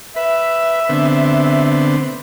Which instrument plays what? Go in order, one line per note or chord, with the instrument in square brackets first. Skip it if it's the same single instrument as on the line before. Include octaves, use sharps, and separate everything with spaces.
[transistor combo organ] B4 [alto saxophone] E5
[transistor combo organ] D3 B3 C4